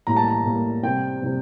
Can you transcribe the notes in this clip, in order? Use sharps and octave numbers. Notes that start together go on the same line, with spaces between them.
A2 G3 A#3 A#5
A5
A#5
A2 G3 A#3
C3 G3 C4 G5
C3 G3 C4